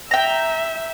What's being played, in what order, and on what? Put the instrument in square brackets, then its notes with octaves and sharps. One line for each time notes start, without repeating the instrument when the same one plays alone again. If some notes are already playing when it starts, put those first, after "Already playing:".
[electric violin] E5 [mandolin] G5 A#5